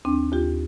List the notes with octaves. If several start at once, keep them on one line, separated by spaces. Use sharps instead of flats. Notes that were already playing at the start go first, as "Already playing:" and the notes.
D#2 C4 D4
D#2 F4 G4